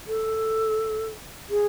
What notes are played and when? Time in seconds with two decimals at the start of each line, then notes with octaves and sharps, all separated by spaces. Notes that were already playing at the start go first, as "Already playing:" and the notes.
0.07 A4
1.49 G#4